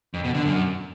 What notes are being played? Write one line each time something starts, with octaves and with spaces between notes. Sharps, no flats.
F2
B2
D3
F#2